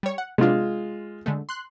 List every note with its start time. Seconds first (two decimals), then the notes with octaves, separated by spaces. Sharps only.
0.03 G3 C#5
0.18 F#5
0.38 C3 G#3 B3 D4 F4
1.26 D3 G#3 A3
1.49 C6 F#6